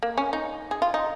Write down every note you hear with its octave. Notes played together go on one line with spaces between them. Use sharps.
A#3
C#4
D#4
G#4
F4
D#4